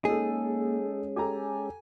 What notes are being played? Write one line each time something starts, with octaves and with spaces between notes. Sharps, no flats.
G#3 A#3 C#4 D#4 G#4 A4
G4 A4 G#5 A#5